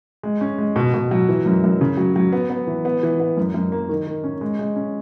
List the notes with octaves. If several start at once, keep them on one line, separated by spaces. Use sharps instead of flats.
G#3
C#4
G#3
B2
B2
F#3
E3
F#2
F#2
C#3
F#3
F#3
B3
B3
E3
B3
E3
B3
F#2
F#2
A#3
D#3
D#3
C#4
G#3
G#3
C#4